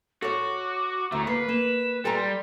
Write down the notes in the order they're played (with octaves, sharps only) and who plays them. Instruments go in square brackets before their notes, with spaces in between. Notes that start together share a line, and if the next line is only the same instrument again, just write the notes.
[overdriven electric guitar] F#4 [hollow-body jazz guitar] A4 C#5 [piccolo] D6
[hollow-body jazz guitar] D2 [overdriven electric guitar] A2 A3 [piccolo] A#5
[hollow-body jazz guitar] A#3 [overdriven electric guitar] B4 [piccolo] C7
[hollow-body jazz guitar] A#3 [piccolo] E7
[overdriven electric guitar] G3 [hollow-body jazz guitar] A4 G#5 A#5 [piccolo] C6